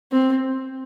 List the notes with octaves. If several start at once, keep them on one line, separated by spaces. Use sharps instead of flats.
C4